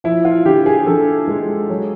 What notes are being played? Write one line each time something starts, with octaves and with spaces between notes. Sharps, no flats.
F3 E4
F4
D3 G4
G#4
D3 A4
G#3
F#3